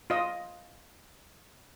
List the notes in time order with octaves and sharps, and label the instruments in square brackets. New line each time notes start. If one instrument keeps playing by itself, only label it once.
[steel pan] F4 D#5